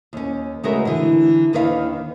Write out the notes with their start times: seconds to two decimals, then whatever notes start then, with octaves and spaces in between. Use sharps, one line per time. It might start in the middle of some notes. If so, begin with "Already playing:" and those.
0.13 D#2 C#4
0.63 C#3 G#3 A3 F#4 A#4 B4
0.85 D3 E3
1.53 D#2 D#3 D4 B4 D5 F5